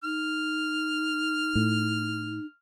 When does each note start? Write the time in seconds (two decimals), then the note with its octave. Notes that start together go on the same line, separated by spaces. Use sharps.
0.04 D#4 F6
1.55 A2